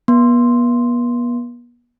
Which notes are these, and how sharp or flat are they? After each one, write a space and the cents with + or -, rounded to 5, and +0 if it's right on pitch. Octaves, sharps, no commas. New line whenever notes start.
B3 -40 C6 +0